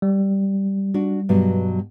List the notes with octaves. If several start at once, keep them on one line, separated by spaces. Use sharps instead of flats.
G3
D4 F#4
G2 B2 F#3